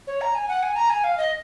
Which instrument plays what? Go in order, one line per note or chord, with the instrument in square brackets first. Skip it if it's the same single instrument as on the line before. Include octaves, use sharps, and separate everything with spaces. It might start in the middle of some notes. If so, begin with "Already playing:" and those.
[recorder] C#5
A#5
G#5
F#5
G#5
A#5
G#5
F5
D#5